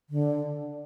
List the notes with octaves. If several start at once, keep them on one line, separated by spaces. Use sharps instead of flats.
D3